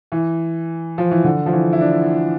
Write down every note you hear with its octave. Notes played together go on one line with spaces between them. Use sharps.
E3
F3
E3
D3
F3
E3
E4
D4